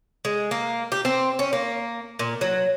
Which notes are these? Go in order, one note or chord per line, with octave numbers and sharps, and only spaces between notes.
G#3
A#3
G4
C4
C#4
A#3
A#2
F#3